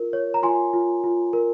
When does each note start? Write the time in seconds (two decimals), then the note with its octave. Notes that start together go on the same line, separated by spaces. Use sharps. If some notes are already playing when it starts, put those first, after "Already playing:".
Already playing: F4 A#4
0.13 C#5
0.34 A#5
0.43 F4 G#5 C6
0.73 F4
1.04 F4
1.33 A#4